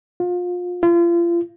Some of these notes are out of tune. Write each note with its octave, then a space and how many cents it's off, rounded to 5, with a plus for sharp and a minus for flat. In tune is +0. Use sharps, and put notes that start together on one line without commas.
F4 +30
F4 -35